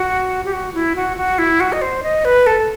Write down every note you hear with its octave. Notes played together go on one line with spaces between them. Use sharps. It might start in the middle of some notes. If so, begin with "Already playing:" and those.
Already playing: F#4
G4
F#4
E4
F#4
F#4
E4
F#4
D#5
C5
D#5
B4
A4